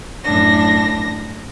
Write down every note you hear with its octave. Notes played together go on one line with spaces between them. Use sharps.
F#2 A2 D4 A#6